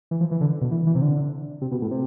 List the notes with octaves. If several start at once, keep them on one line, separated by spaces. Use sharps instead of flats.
E3
F3
E3
D3
B2
E3
E3
C3
D3
C3
B2
A2
C3